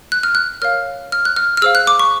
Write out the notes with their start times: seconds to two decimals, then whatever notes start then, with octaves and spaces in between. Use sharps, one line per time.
0.12 F#6
0.23 F6
0.35 F#6
0.62 A#4 C#5 F5 F6
1.12 F6
1.25 F#6
1.36 F6
1.57 F6
1.62 G#4 C5 F5 E6
1.75 F#6
1.87 D6
1.99 C#6